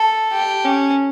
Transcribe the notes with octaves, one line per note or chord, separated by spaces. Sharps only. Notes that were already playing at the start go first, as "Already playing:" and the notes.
Already playing: A4
G4
C#4